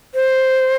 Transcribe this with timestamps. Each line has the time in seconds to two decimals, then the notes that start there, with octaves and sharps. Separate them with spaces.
0.14 C5